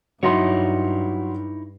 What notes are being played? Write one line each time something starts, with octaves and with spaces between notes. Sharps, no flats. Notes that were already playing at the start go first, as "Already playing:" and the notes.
G2 F#3 D#4 E4 C#5 C6